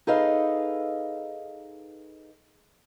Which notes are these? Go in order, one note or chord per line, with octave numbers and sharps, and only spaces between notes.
D#4 G#4 A4 B4 D#5 F5